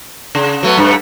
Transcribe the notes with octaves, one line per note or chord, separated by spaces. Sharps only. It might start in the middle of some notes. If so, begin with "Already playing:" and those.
C#3
F#3 A3 B3
G2 A3